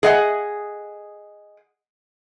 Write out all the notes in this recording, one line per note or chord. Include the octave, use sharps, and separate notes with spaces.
G#4 D#5 F#5